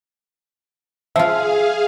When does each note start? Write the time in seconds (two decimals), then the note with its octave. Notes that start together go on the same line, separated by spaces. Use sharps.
1.16 F3 F4 G#4 E5 F5